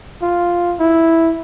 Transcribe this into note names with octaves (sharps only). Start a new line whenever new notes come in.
F4
E4